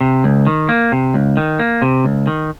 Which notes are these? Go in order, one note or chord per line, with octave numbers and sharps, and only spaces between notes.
C3
C#2
D#3
A#3
C3
C#2
D#3
A#3
C3
C#2
D#3